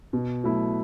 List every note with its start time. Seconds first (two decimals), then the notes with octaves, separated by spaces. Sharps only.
0.13 B2
0.44 F#3 A3 E4